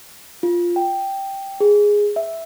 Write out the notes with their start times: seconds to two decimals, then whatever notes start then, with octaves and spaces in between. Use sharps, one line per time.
0.43 F4
0.76 G5
1.60 G#4
2.16 E5